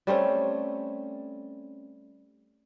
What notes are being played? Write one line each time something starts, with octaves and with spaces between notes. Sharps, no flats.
G3 A3 C4 C#4